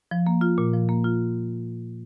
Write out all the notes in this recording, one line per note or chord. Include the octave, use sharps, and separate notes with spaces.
F3
A#3
F4
A#2
F3
A#3
F4